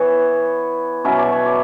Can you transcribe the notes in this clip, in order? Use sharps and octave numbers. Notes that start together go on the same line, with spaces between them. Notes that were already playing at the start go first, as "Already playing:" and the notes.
Already playing: E3 B3 C#5 E5
B2 F#3 C#4 E5
D5
C#5
D5